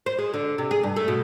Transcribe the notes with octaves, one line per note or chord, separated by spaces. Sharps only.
C5
G#3
D3
C3
G#4
G2
A3
B2